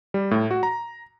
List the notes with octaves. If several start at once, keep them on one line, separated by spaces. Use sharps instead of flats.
G3
A2
F#4
A#5